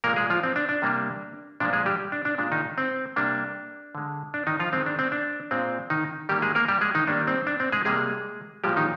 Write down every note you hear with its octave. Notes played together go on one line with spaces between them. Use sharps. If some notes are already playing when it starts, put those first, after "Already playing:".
A#2 G#3 A#3 A#4
G#3 G#4
F3 F4
C4
D4
D4
C3 G3 A#3
A#2 F3 G#3 D4
G#3 G#4
G3 G4
D4
D4
A#2 G#3 D4
D#3 D#4
C4
C3 G3 A#3 D4
D3 G#3
D4
D#3 D#4
F3 F4
D#3 G#3 C4
D4
C4
D4
A#2 G#3 C4
D#3 D#4
D#3 G3 A#3 G4
G#3 G#4
A#3 A#4
G3 G4
G#3 G#4
D#3 D#4
D#3 G3 A#3 D4
C4
D4
C4
G#3 G#4
C3 G3 G#3 A#3 G#4
A#2 F3 G3 G#3 G4
D#3 D#4